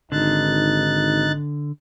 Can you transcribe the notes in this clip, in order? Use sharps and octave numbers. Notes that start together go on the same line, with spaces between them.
G#1 D3 D#4 F#6 A6